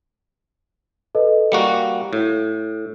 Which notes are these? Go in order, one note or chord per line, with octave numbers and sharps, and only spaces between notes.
A4 B4 D#5
G3 A#3 F#4 C#7
A2